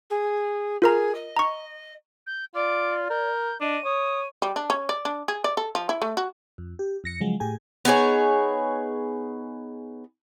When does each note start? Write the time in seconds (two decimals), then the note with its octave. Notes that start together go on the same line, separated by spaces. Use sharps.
0.09 G#4
0.82 F4 G#4 A#4 A#5
1.14 D#5
1.37 A#5 C#6
2.27 G6
2.55 F4 D5 D6
3.10 A#4 G6
3.61 D4 D#5 D#7
3.84 C#5 D#6
4.42 G3
4.56 D4
4.70 C#4
4.89 D5
5.05 D4
5.28 G#4
5.44 D5
5.57 A4
5.75 F3
5.89 E4
6.02 A3
6.17 F#4
6.58 F2
6.79 G4
7.04 F2 A#6 C#7
7.20 C#3 F3 F#3 G#3
7.40 A2 G4 G#4 G#5
7.85 B3 D#4 G#4 C#5